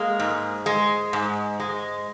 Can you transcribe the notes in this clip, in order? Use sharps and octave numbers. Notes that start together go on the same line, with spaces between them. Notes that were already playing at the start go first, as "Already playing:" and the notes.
Already playing: G#3 A#3
G#2
G#3
G#2
G#3